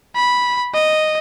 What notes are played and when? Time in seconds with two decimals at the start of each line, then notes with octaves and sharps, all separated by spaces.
0.15 B5
0.74 D#5